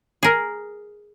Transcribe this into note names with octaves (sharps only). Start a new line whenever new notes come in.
G#4 A#4